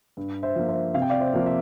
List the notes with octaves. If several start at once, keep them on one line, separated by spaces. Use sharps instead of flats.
G2
C5 E5
F3 A#3
C5 E5
C3 F5
G5
D5 F5
C5 E5
F3 A#3
E5